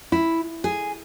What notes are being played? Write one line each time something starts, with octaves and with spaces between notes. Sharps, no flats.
E4
G#4